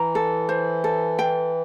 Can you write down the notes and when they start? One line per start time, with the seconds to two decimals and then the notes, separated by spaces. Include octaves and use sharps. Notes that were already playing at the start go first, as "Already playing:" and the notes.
Already playing: E3 A#5
0.15 A4
0.49 C5
0.84 A4
1.19 G5